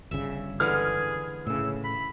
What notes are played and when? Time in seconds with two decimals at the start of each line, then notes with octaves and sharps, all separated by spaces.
0.11 G1 G2 C#3 E5
0.60 D3 E3 G#3 G#4 F6
1.47 A2 C#3 E6
1.84 B5